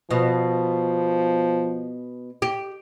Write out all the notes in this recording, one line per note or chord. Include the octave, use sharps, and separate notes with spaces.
B2 F3
G4